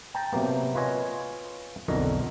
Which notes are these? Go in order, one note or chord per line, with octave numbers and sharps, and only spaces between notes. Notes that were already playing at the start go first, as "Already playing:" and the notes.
G5 A5 A#5
C3 F#3 A#3 B3
F4 B4 C#5 D#5 G#5
B1 F2 D3 F#4 A#4 D#5